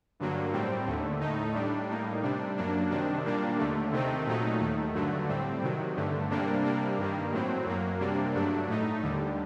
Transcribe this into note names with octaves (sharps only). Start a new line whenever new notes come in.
G2 D3 F#3 A#3
A2 G3 C4
D#2 D3 A3
A2 A3 D#4
A2 G3 D4
A2 G3 A#3 D#4
C3 G3 D4
F#2 F#3 A#3 D4
C3 D#3 G3 D4
A#2 G3 A#3 D4
D#2 D3 A3
C3 D#3 A3 C4 D#4
A#2 F#3 A3 D#4
D#2 D#3 A3
G2 D3 F#3 A3
A2 G3 C4
C3 D#3 F#3
G2 D3 A3
C3 G3 A#3 D4
C3 G3 A#3 D4
G2 D#3 G3 A#3
A2 F#3 C4
F#2 F#3 A#3
C3 G3 A#3 D4
G2 F#3 A3 D4
A2 A3 D#4
D#2 D3 G3